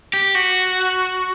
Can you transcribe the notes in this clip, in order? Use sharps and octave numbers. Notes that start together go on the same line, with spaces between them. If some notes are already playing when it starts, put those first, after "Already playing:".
G4
F#4